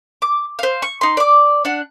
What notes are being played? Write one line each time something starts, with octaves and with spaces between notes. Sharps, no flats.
D6
C5 F5
C#6
D#4 C6
D5 D6
D4 F#5